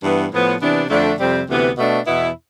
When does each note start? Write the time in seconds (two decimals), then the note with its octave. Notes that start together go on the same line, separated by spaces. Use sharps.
0.03 G2 E3 B3
0.31 A2 F3 B3
0.60 C3 E3 B3 D4
0.90 F2 D3 A3 D4
1.19 F2 C3 G3 C4
1.48 D2 C3 E3 B3
1.77 B2 A3 D4
2.06 E2 B2 B3 E4